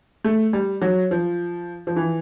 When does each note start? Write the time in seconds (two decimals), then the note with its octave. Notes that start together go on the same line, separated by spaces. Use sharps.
0.24 A3
0.53 G3
0.82 F#3
1.11 F3
1.87 F3
1.96 E3